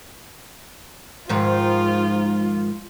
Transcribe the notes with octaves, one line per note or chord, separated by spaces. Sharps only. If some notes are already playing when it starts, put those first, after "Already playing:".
G#2 D#3 F3 F4